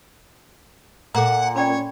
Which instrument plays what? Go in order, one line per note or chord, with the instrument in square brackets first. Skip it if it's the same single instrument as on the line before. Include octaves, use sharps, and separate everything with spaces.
[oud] A#2 [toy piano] A4 A#5 [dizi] F#5
[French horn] C#4 [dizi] C#5 [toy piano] D5 G5 B5